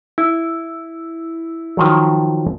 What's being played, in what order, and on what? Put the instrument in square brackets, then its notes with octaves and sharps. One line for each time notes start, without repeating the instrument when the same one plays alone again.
[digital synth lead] E4
[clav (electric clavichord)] D#3 F3 F#3